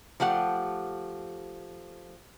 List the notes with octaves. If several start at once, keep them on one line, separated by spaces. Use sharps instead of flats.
F3 A3 G4 F#5